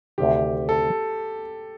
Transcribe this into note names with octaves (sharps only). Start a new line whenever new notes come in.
D2 C3 D#3 G4
A4